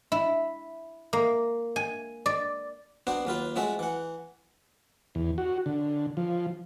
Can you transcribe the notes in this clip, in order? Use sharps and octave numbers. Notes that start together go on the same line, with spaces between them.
E4
A#3
G#5
D5
B3 D4 F#4 C5
D#2 F#3 F4 B4
F3 G#3 A3 F#4 E5
E3 F#5
E2
F#4
D3
F3